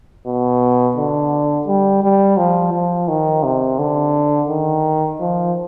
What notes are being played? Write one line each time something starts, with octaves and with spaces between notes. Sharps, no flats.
B2
D3
G3
G3
F3
F3
D#3
C3
D3
D#3
F3